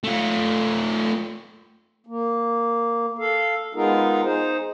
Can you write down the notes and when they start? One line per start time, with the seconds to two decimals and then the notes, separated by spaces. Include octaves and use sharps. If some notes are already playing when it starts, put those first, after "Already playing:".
0.04 A3 F4
2.07 A#3
3.18 A4 F5
3.75 G#3 B3 D#4 F4 G#4 A#4
4.24 D#4 G#4 C5